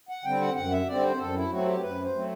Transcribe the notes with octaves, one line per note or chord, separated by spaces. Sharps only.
F#5
D3 G3 C4 G5
F#5
F#2 F#5
E5
D3 G3 C4 D5
C5
F#2 A4
E4
F#3 A3 C4 F#4
G4
F#2 B4
C5
F#3 A3 C4